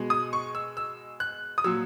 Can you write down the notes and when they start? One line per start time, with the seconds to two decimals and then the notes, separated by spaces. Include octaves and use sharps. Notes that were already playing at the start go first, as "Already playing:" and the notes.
Already playing: B2 G#3
0.10 D#6
0.33 C#6
0.55 E6
0.77 E6
1.20 F#6
1.58 D#6
1.64 A#2 F#3 E6